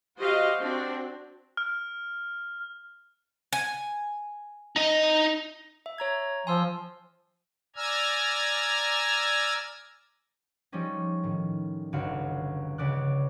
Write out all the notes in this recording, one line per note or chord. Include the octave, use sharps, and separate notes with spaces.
F#4 G4 C5 D#5 F5
C4 D4 F#4
F6
G#5
D#4 D#5
E5
C#5 A#5 G#6
F3 G#5 C6 E6
D5 G#5 A#5 E6 F6 G#6
F3 G3 G#3 C#4 D#4
A2 D#3
G1 C#2 D3 F#4 F5 F#5
C#2 C#3 D5 F#6